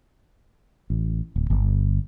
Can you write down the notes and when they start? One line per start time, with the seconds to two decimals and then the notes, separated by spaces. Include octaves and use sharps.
0.90 A1
1.36 D1
1.50 G1